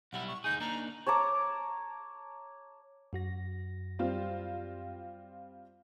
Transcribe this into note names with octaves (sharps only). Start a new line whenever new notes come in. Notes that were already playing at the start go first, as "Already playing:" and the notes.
B1 G3 E4 F#5
C#6
D2 D#4 G#4 G6
A#3 D4 D#4 A#5
C#5 A5 A#5 D6
F#2 F#4 A#6
G3 C4 F4